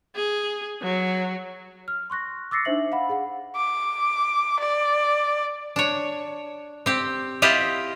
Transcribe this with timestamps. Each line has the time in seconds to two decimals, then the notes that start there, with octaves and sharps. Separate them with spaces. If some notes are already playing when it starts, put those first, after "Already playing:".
0.15 G#4
0.82 F#3
1.88 F6
2.10 C6 C#6 F#6 A#6
2.51 D6 E6 A6 A#6 C7 C#7
2.65 D4 D#4 C5 E5 F#7
2.92 F5 F#5 B5
3.09 G#4 F5 F#5
3.56 D6
4.59 D5
5.76 D4 C#5
6.86 C4 G4
7.42 E4 F4 G4 D#5 F5